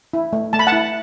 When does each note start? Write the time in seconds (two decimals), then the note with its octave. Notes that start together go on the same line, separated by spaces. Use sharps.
0.13 E4
0.33 A3
0.53 A3 A5
0.59 B5
0.67 F#5 A5
0.72 E4